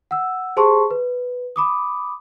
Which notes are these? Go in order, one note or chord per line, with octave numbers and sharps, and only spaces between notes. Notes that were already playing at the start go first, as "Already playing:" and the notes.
F#5 E6
G4 G#4 C5 A5 C6 C#6
B4
B5 D6 D#6